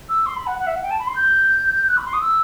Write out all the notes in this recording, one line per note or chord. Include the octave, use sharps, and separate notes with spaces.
E6
C6
B5
F#5
F#5
E5
F#5
G5
A5
B5
C6
G6
F#6
B5
C6
D#6
E6